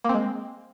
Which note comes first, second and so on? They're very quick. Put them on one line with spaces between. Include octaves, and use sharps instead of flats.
A#3 C4 G#3